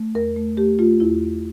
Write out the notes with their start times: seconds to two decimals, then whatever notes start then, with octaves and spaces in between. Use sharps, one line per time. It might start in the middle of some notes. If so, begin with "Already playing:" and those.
Already playing: A3
0.15 E2 A#4
0.36 A3
0.57 A3 G4
0.79 A3 F4
1.00 E2 E4
1.22 E2